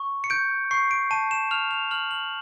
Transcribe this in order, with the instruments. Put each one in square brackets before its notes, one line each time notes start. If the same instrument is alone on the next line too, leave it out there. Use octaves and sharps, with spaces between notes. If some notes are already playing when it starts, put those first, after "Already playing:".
Already playing: [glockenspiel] C#6
C#7
G6 D7
C#6 C7
D7
A5 D#7
E7
F6 F7
F7
F6 F#7
F#7